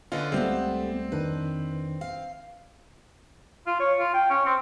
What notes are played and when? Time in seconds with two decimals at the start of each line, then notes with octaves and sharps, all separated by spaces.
0.12 D3 C#4 F4 B4 D#5
0.32 C#2 G3 A3 B3 C4 G4 A4
1.12 F2 D#3 D4 B4
2.01 F5
3.67 F4
3.80 C#5
3.99 F4
4.14 G5
4.30 C#4
4.46 C4